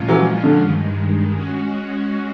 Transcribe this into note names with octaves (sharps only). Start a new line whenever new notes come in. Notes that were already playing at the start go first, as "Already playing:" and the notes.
Already playing: A#2 F3 G#3 C#4 F4
E3 F#3
D3
G2 D#3 G#3
G#3 C#4 F#4